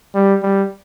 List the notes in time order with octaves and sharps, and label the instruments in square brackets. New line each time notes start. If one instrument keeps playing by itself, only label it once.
[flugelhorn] G3
G3